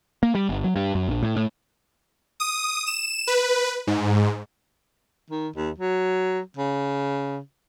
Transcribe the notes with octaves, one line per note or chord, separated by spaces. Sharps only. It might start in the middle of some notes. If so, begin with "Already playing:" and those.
A#3
G3
G1
F#3
G2
F#2
A#1
A2
A2
D#6
E7
B4
G#2
D#3
D#2
F#3
C#3